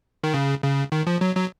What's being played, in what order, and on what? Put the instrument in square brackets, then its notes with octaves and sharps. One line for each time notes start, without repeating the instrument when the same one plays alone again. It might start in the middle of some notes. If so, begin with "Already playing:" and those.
[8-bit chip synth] D#3
C#3
C#3
D#3
F3
F#3
F#3